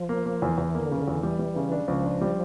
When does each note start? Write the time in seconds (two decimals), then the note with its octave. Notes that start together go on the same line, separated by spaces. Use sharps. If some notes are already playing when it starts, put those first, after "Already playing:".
Already playing: F3
0.09 A#3
0.26 A#3
0.42 E2
0.58 E2 E3
0.75 A#3
0.80 D3
0.91 C#3 E3
1.02 D3
1.08 E2
1.23 E3 G3
1.39 G3
1.56 C#3
1.71 D4
1.88 C#2 F3
2.04 D4
2.21 G3